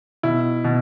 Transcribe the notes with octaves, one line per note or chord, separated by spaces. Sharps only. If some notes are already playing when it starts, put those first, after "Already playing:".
B2 E4
B2